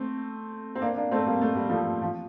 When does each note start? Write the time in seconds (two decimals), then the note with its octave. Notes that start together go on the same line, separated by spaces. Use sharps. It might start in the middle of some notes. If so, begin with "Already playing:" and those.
Already playing: A3 C4
0.75 C4
0.82 A#3 D4
0.96 A#3 D4
1.11 A3 C4
1.27 G3 A#3
1.41 A3
1.56 G3
1.69 F3 A3
2.02 F3